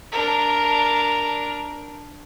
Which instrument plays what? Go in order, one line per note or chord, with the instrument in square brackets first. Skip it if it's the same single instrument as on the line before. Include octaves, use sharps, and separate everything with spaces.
[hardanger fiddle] D4 A#4